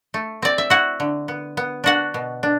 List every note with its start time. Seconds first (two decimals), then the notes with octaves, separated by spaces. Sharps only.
0.14 A3
0.42 C4 D5
0.58 E5
0.70 E4 F#4 F#5
1.00 D3
1.28 B3
1.57 B3
1.84 D4 F#4 F#5
2.14 B2
2.43 D4